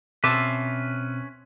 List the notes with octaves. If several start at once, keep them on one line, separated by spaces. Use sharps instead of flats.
B2 C4 C#4 B4 C5 E5 A5 D6